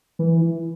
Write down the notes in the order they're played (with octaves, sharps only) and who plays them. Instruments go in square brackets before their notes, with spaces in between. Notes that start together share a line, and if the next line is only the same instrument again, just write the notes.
[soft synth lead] E3